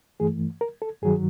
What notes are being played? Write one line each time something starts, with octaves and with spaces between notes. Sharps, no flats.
G2 E3 A3 G#4
A#4
A4
G2 D#3 F#3 G#4